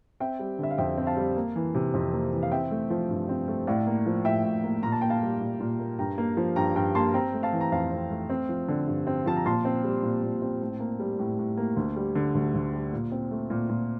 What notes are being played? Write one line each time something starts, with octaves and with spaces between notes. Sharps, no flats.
C4 E5 G5
G3
D3 E5
F5
F2 E5 G5
C4
F5 A5
G3
A#3
E3
C3
F2
A#3
E3
F5
C4 E5 G5
A3
F3
G2
C4
A3
A2 D5 F5
A#3
F3
A2 E5 G5
A2
A#3
A#2 A#5
A5
A#3 G5
F5 A5
G3
A#2
A#2
A#3
G2 G5 A#5
A#3
F3
G2 G5 A#5
G2 G5 A#5
A#3 A5 C6
C4 G5 A#5
A3
F5 A5
E3
A#5
F2 F5 A5
C4
A3
C4
F3
D3
G2
C4
F3 A5
A#5
A#2 A5 C6
C4
G3
A#2
A#2
C4
A2
A#3
G3
A2
A2
A#3
D2
G3
D3
D2
D2
G3
A#2
C4
A3
A#2
A#2